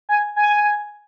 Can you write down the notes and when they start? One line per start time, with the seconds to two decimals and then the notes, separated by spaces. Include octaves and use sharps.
0.09 G#5
0.36 G#5